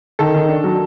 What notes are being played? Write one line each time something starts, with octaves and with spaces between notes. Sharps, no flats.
D#3 A4
D#3
D4
F#3